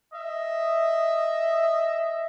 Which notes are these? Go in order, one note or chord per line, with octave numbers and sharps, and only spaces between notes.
D#5 E5